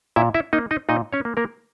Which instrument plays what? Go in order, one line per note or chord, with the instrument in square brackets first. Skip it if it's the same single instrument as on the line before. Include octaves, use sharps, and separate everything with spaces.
[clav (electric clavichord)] A#2 E4 E5
E4 E5
A#3 D#4 D#5
D#4 D#5
A#2 D#4 D#5
C#4 C#5
A#3
A#3 A#4